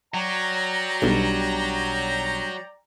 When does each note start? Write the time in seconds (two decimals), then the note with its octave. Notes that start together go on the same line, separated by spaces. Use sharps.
0.14 F#3 D5 G5 A#5
1.02 B1 G3 D4